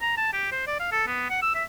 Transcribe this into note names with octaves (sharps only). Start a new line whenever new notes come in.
A#5
A5
G4
C5
D5
F5
A4
B3
F#5
E6
E5